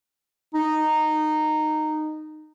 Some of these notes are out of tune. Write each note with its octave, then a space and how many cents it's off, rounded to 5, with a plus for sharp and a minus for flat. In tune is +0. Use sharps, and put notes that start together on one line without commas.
D#4 -15